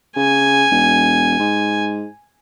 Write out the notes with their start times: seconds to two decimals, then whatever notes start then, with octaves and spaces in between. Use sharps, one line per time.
0.17 C#3 G#5
0.71 E1
1.40 G#2